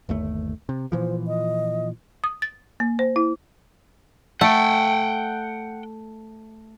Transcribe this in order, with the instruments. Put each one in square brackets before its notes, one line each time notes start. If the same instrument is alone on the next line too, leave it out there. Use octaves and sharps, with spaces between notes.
[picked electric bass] G1 D#2 A3
C3
[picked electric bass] A#2 E3 F3 [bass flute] C5
[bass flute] D#5
[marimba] D#6
A6
A#3
C5
E4
[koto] A3 [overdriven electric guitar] F#5 G5